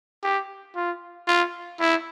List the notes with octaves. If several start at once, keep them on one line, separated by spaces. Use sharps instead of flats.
G4
F4
F4
E4